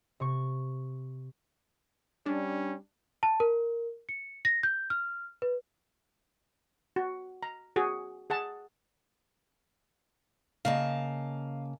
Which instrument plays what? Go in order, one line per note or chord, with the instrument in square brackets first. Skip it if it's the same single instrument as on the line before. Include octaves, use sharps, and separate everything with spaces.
[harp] C3 C#6
[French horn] G3 [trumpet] C#4 [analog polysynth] D4
[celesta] A5
A#4
C#7
A#6
G6
F6
B4
[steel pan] F#4
A#5
F#4 G#4
G#4 F#5 A5
[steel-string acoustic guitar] C#3 A#3 A5 [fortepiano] D#5 F5